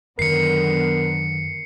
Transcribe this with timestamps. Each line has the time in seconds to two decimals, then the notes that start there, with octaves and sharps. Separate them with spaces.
0.19 F#2 D3 D#3 F#3 B3 A#4 C7 C#7